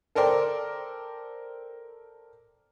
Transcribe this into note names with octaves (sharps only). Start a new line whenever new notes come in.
A4 A#4 C5 D5 G5